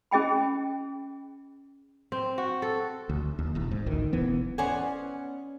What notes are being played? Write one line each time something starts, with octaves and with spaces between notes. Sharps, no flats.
C#4 G#4 D#5 G5 B5
C4
F#4
A4
D2
D#2
E1 E2
G#2
A1 D2 D#3
E1 E3 B3
B3 C#4 C5 D5 F#5 G#5